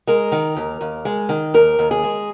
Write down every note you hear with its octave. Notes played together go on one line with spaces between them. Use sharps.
G#3 A#4
D#3
D#2
D#2
G#3
D#3
D#2 A#4
D#2
G#4
G#3